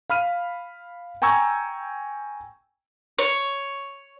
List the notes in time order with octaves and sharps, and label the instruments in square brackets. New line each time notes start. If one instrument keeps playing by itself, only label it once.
[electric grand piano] F5 B5 F6 D#7
G5 G#5 A#5 C#6 E6 G#6
[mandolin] C#5